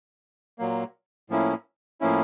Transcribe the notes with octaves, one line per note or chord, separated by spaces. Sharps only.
A#2 F#3 A#3
A2 F3 A#3 C#4 E4
A2 F3 A#3 C#4 E4